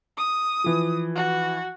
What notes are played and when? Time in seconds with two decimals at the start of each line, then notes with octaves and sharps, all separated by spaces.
0.17 D#6
0.64 E3 F3
1.15 F#4